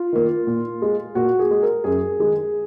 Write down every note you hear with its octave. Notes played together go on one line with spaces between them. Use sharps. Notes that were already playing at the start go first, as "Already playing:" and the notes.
Already playing: F4
D#3 A#3
A#2
G#3
A#2 F#4
G#4
G#3
A#4
F#2 G#4
D#3 G#3